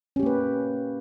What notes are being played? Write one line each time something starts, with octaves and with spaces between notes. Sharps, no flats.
A#3 C#4 G4 B4